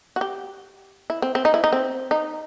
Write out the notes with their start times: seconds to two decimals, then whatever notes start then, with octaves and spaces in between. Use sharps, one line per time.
0.16 F#4
0.21 G4
1.10 E4
1.22 C4
1.35 C4
1.45 D#4
1.54 E4
1.64 D#4
1.72 C4
2.11 D#4